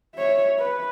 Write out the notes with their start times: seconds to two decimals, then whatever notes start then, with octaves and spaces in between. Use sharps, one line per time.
0.15 C#5 E5
0.59 B4